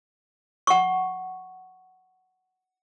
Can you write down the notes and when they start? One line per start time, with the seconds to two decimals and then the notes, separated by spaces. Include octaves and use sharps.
0.67 F#5 C#6